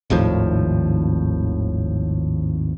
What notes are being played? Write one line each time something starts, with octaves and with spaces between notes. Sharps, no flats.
G#1 D#2 A2 F3